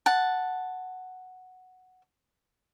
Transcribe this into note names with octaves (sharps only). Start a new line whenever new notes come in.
F#5 A5